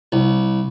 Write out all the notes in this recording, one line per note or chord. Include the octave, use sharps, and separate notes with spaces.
C2